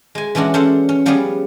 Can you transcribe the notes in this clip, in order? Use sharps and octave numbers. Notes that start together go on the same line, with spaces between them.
G#3 G#5
E3 G#3 C#4 D4 F#4
C#4 A4 C5 E5 F#5
C#4
F3 G3 B3 C#4 G#4 B4